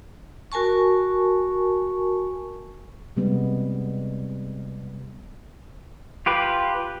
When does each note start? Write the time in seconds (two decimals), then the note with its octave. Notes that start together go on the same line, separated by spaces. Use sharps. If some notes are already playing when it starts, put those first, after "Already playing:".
0.52 F#4 A#4 G#5 A5 C#6
3.16 C3 G3 G#3 B3
6.26 F4 G4 B4